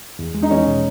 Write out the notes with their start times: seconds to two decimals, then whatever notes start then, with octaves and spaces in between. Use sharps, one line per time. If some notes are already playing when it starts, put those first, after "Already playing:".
0.19 E2
0.34 G#3
0.42 D#4
0.50 E2 C#4
0.67 B2